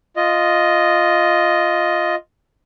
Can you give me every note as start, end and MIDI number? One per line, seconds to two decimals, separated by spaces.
0.16 2.15 65
0.16 2.15 75